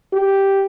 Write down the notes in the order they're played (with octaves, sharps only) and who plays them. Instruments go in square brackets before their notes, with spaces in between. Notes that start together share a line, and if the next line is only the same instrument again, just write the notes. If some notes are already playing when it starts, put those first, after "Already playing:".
[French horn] G4